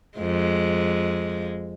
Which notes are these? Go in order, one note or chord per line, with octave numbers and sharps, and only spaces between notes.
F2 G#3